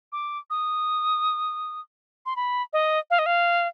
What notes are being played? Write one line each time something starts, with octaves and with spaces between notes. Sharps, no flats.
D6
D#6
C6
B5
D#5
F5
D#5
F5